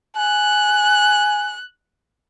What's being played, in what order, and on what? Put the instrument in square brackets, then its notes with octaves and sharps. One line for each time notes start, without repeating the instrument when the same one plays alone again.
[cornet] G#5 [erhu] F#6